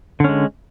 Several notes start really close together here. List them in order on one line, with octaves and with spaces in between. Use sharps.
D3 C#4 G#3